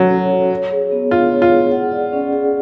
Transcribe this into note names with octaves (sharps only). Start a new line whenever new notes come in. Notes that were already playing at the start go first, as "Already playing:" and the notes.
Already playing: F#3 C#4 F#4 A4 C#5
C#5
A4
C#5
G#4
B3
D4 F4
C#5
F4
G#4
F#5
D5
C#4
G#4